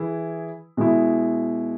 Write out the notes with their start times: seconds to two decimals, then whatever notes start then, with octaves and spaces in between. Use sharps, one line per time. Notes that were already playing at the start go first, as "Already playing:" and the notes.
Already playing: E3 E4 G#4
0.77 B2 G#3 E4